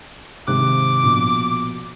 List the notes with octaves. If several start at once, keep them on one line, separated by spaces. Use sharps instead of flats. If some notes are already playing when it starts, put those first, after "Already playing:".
G#1 C3 D6 F#6
A#1 B2